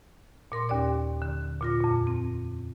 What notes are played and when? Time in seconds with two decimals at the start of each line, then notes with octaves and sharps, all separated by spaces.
0.52 A#2 A#4 C6
0.69 D#2 C#4 G4 D5 D6
1.22 D3
1.61 A#2 F4 A#6
1.81 F2 A#2
2.07 C4